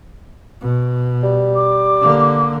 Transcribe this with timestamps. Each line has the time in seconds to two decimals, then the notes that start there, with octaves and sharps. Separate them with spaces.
0.61 B2
1.23 G3
1.55 D6
2.01 D3 A#3